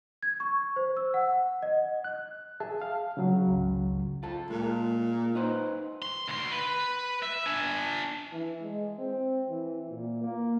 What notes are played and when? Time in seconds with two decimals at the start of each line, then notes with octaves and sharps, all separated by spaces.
0.23 G#6
0.40 C#6
0.76 C5
0.97 E6
1.14 F#5
1.62 D#5
2.04 F#6
2.60 G#4 E5 A5
2.82 F5
3.17 C#3 F#3
3.47 G#1 C#2
4.23 F4 A4
4.50 A#2 G#3
5.35 D#4 B4 C5
6.02 C6
6.28 D2 C6
6.51 B4
7.23 E5
7.46 D4 G#5
8.32 E3
8.62 G#3
8.98 C4
9.49 E3
9.90 A#2
10.23 A#3